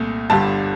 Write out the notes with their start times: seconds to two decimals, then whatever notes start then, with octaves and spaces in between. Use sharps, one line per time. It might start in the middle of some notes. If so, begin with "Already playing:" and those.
Already playing: C2 A#2 A3
0.30 G1 G2 D3 G3 A5